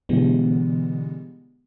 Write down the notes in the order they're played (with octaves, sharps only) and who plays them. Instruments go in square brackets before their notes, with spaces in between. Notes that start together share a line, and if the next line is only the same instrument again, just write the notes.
[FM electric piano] B2 D3 E3 G3 G#3 B3